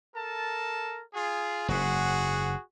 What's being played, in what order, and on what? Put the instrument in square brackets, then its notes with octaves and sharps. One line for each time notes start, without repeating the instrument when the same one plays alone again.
[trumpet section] A4 A#4 A5
F4 G#4
[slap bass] F#1 G#2 [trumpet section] F#4 G#4 F#5